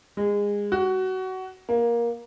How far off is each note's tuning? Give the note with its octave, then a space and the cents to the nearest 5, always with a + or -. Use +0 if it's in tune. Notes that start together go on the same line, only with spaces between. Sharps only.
G#3 -25
F#4 +20
A#3 +15